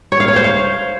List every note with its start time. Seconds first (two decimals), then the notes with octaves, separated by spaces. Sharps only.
0.12 C#5
0.20 F5
0.28 C#5
0.36 C5
0.44 F5